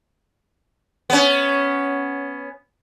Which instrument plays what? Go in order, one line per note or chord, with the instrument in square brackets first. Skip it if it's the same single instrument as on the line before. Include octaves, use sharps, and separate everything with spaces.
[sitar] B3 C#4